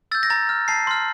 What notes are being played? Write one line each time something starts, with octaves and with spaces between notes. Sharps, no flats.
E6 G6 A6
A#6
A#5 A6
F6
A5 C7
C6 F6